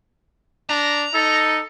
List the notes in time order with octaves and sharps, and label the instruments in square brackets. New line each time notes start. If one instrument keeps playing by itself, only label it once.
[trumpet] D4 [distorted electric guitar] A#5
[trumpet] D#4 [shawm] A4